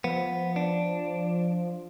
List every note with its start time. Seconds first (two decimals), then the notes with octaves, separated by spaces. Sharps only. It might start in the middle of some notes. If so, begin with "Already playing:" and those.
0.04 F3 B3
0.56 D4